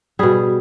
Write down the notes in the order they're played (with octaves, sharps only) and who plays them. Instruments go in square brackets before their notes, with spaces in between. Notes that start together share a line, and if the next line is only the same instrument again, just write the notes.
[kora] B2 G3 G#4